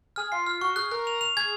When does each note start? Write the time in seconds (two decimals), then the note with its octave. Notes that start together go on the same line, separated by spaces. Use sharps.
0.16 G#4 F6
0.32 F4 C7
0.46 F4 F6
0.61 F#4 C#6
0.76 G#4 F#6
0.91 A#4 F#6
1.07 F7
1.21 F7
1.37 G#4 G#6